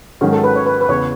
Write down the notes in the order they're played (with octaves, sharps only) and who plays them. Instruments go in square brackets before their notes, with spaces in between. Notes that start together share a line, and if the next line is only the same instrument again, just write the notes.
[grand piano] G#2 D#3 F#3 C#4 [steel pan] G#4
[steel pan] A4
B4
C#5
B4
B4
[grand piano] E2 C#3 E3 [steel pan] C#5